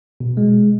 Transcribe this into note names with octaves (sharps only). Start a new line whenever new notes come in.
B2
G#3